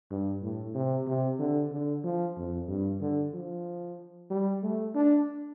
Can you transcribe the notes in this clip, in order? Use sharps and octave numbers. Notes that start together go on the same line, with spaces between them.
G2
A2
C3
C3
D3
D3
F3
F2
G2
D3
F3
G3
A3
D4